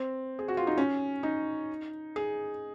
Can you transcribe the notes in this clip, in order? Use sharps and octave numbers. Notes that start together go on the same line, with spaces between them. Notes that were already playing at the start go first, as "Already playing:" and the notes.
Already playing: C4
G#4
F#4
F4
D#4
C#4
D#4
G#4